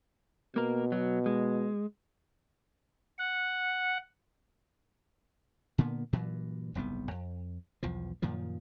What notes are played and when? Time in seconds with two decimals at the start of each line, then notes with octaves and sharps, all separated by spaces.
0.56 B2 A#3 A#4
0.92 F#3
1.26 G#3
3.19 F#5
5.78 A#2 D3 A#3 B3
6.13 G2 A#2 E3 F#3
6.75 F#1 C2 G#2 B3
7.11 F2
7.83 B1 E2 F3
8.22 F#2 A#2 D#3 F3